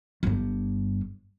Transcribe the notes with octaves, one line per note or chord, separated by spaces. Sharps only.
G1 G2